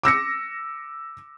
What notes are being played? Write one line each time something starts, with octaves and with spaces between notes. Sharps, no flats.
D6 E6 A#6 C#7